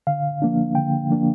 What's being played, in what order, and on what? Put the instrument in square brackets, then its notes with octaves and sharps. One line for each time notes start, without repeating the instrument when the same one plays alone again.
[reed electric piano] D3 F5
F3 A#3 D4
D3 G5
F3 A#3 D4